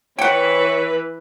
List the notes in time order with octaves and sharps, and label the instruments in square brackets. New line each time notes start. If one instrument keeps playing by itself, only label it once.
[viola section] E3 B4 [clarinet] C#5 [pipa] F#5 G5